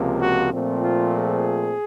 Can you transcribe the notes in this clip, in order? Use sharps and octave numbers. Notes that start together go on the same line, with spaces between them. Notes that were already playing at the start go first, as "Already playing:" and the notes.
Already playing: C#2 C3 F3 A#3
F#4
A#2 F3 A3 C4
F4
G#4